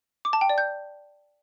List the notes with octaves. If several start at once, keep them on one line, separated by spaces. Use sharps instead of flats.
D6
A5
G5
D5
G6